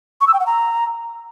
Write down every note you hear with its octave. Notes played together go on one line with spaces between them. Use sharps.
C#6
E6
G5
F#5
A#5